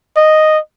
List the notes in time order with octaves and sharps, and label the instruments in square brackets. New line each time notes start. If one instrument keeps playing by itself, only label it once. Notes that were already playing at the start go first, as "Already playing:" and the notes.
[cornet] D#5